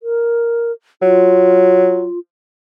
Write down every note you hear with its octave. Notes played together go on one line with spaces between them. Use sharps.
A#4
F#3 F4